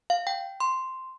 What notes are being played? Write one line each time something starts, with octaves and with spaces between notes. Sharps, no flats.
F5
G5
C6